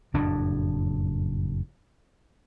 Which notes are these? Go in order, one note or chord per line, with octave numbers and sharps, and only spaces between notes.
F#1 F2 A2 D4